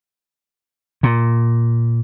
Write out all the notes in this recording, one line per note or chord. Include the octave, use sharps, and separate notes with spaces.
A#2